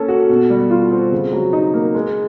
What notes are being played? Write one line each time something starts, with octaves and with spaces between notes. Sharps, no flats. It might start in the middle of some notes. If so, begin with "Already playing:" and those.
Already playing: A#3 C#4 A4
F#4
B2
G3
F4
C4
C#3
F#3
D#4
A#3
G#3